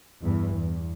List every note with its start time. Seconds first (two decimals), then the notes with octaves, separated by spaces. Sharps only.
0.21 E2 G2 E3
0.54 E2